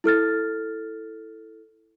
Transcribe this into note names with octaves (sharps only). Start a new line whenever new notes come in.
E4 A4 F6 A6